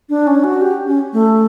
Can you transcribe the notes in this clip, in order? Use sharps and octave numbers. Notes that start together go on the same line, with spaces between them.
D4
C#4
F#4
G4
C#4
A3